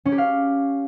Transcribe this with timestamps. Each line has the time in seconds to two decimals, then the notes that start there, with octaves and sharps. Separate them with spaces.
0.05 C#4
0.12 G4
0.18 F5